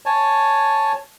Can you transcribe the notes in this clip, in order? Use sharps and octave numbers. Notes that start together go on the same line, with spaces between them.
C#5 G#5 A5